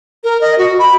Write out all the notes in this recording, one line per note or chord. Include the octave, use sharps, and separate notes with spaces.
A#4
D#5
F#4
B5